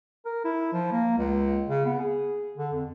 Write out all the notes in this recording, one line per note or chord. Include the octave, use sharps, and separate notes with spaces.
A#4
E4
F3
A#3
C#2
C#3
B3
G#4
D3
F2